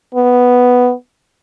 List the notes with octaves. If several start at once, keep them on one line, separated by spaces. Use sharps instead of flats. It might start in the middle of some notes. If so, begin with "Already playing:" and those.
B3